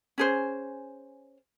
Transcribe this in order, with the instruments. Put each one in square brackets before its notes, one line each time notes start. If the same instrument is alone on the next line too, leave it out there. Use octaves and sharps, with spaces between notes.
[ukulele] C#4 G#4 C5